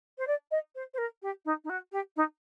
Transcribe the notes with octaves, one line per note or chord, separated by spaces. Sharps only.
C5
D5
D#5
C5
C5
A#4
G4
D#4
D#4
F#4
G4
D#4